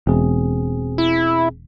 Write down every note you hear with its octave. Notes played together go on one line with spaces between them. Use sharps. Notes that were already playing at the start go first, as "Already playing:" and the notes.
E1 B2 C4 G#4
E4